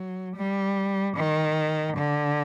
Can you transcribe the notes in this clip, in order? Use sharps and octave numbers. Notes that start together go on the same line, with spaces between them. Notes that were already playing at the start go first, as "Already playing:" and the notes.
Already playing: F#3
G3
D#3
D3